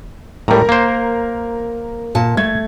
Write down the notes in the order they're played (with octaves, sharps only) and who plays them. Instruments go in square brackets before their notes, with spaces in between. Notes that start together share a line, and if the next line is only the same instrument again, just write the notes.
[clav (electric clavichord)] A2 G3 [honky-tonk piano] A#4 A#5
[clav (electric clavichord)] A#3 C5
[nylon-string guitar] A#2 A5
[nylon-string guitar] A3 [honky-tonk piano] G#6